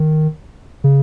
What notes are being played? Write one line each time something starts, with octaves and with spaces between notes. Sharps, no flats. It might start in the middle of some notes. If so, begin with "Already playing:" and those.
Already playing: D#3
C#3